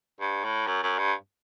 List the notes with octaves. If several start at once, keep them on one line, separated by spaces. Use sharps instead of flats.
G2
A2
F#2
F#2
G2